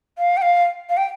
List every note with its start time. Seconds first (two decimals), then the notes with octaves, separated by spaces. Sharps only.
0.18 F5
0.37 G5
0.42 F5
0.89 F5
0.97 G5